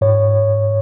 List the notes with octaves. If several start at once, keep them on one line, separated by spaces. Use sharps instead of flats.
G#2 C#5